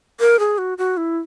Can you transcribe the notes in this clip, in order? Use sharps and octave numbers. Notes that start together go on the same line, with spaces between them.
A#4
G#4
F#4
F#4
E4